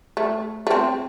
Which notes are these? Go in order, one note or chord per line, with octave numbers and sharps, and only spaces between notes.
A3
A3
C4